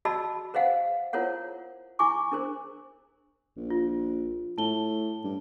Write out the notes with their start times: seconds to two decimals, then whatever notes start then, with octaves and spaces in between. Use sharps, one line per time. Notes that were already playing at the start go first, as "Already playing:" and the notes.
0.05 F#4 D5 D#5 A5 B5 E6
0.54 B4 C5 D#5 F5 F#5
1.13 E4 F4 A#4 C5 C#5 F#5
1.99 E4 G#5 C#6 D6
2.32 D4 A#4 C5
3.57 A#1
3.70 F4
4.58 A2 A5 G7
5.24 G2